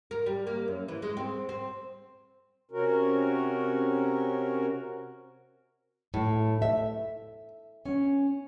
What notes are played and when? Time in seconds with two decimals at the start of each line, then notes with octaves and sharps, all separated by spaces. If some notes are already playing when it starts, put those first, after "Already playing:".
0.11 A#4
0.26 G3
0.47 A#3
0.68 F#2
0.88 E3
1.02 G#3
1.17 C4
1.49 C4
2.71 C3 C#4 F#4 A#4
6.14 A2
6.62 E5
7.85 C#4